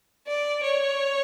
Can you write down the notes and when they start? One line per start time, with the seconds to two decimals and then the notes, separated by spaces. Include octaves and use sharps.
0.28 D5
0.63 C#5